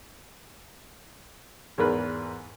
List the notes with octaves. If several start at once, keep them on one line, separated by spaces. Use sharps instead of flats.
E2 G#2 A#4 B4